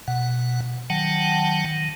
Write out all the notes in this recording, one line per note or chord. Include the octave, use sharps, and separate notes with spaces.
B2 F#5
D#3 F#3 F#5 G5 A5
D#3